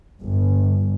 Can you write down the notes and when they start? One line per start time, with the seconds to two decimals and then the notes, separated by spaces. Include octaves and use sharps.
0.21 G1